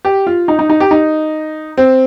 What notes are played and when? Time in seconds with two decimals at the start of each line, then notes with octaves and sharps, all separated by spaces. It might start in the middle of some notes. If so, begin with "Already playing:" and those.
0.05 G4
0.27 F4
0.48 D#4
0.59 D#4
0.70 D#4
0.80 G4
0.91 D#4
1.78 C4